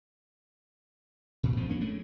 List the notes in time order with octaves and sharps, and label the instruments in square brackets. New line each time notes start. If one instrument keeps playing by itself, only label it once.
[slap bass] A#2
F2 F3 C4
F#3 A#3 C#4 D4
G#3 A3 C#4 D4